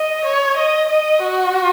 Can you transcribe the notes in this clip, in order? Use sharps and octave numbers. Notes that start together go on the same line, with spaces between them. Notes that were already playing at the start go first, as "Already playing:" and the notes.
Already playing: D#5
C#5
D#5
D#5
F#4